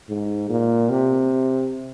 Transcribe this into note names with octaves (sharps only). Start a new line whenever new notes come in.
G#2
A#2
C3